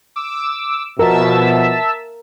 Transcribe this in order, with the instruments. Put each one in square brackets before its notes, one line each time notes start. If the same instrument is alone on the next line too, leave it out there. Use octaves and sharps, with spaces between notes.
[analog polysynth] D6 E6
[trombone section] B2 [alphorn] F3 [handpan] A#4 [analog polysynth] E5 A5 E6